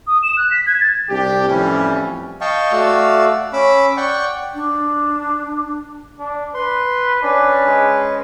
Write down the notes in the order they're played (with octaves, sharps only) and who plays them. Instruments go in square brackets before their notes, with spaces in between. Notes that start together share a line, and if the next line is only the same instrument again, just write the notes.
[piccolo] D#6
E7
F#6
B6
G#6
A6
[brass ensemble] C2 D4 G4
F2 A2 E3 G3 C4 C#4
[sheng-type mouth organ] D#5 F5 G5 A5 C#6
A3 F#4 D5 F5 E6
C#4 B5 D6 E6
D5 F#5 G5 C#6
[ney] D4
[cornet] D4
[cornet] B4 [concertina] C6
[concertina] C#4 B4 [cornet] D4
[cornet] G#3